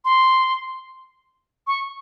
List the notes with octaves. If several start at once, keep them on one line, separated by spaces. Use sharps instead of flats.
C6
C#6